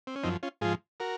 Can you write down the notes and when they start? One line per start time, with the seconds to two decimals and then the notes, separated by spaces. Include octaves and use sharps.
0.07 C4
0.16 C#4
0.23 F#2 F3 C4 D#4
0.43 C#4 F4
0.61 G#2 F3 F4 G#4
1.00 F#4 A#4